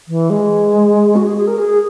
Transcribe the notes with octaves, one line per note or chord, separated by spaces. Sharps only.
E3
G#3
F#4
G#4
G#4
A#4
G#4